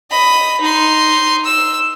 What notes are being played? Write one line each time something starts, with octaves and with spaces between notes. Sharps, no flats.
D#5 B5
D#4 C6
E6